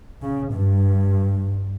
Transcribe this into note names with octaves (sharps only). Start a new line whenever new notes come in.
C#3
G2